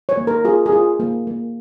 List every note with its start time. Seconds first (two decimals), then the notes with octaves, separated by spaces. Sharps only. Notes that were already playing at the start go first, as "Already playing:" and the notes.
0.09 C#5
0.17 A#3
0.27 A#4
0.45 F4 G#4
0.66 G#4
0.72 F4
1.00 A#3
1.27 A#3